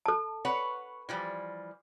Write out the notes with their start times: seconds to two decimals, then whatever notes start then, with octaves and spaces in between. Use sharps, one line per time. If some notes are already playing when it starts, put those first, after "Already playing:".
0.06 A4 A5
0.45 B4 C#5 F#5
1.09 E3 F3 G3